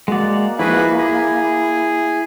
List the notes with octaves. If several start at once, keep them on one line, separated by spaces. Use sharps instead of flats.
G#3 A#3 F#4 G#4 D5 F#5
F3 G#3 E4 F#4 G#4 B4
G#4 A#6